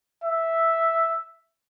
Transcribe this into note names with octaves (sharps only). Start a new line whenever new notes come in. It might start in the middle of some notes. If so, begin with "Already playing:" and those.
E5